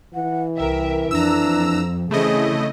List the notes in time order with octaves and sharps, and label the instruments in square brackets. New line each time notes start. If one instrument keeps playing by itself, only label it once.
[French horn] E3 [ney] F#5
[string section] C2 A#4 E5 [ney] G5
[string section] F2 [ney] D4 [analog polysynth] A#5 E6
[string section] C#3 E3 C4 [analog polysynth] A3 E4 D#5 [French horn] C#4 [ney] G#4